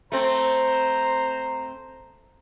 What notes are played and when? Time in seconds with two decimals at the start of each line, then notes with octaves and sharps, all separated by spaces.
0.12 A3 C4 C5 A#5